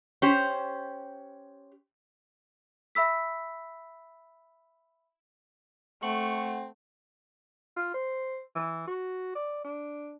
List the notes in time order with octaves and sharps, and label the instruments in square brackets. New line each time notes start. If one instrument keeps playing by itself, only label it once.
[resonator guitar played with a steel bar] C#4 G4 C5
[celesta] E5 B5 E6 B6
[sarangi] A3 [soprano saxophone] C4 [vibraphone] F#5 [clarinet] C#6
[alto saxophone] F4
C5
E3
F#4
D5
D4